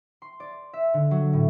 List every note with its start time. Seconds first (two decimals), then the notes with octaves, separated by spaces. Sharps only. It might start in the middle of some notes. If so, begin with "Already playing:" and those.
0.22 C6
0.40 D5
0.73 E5
0.94 D3
1.11 F#3
1.33 A2